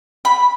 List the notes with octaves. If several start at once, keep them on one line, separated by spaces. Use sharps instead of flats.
B5